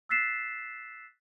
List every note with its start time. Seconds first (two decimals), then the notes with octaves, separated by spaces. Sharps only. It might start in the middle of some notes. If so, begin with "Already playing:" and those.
0.09 E6 F#6 A6 B6 C7 E7